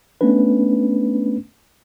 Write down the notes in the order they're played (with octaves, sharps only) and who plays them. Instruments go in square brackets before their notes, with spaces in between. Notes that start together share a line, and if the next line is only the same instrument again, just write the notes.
[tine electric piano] A3 B3 C#4 D4 B4